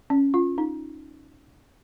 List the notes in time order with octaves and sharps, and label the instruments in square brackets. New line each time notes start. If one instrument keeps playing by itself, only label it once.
[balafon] C#4
F4
D#4